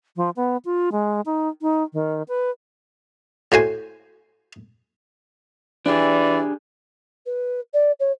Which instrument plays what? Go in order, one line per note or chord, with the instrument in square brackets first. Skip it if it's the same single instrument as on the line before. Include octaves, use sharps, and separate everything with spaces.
[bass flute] F3
B3
F4
G#3
D#4
D#4
D#3
B4
[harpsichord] A2 F#4 C5 G#5
[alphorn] E3 [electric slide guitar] D4 G4 G#4 [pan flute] D5
[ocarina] B4
D5
C#5